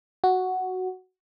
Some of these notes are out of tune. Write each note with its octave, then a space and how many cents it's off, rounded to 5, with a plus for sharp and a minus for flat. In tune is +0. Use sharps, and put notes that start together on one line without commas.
F#4 +5